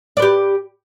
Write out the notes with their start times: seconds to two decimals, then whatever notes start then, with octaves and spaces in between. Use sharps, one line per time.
0.17 D5
0.19 B4
0.22 G4